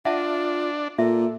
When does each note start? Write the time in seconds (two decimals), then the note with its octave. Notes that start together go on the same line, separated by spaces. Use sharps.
0.05 D4 F4 E5 F#5 A5
0.98 A#2 A4 E5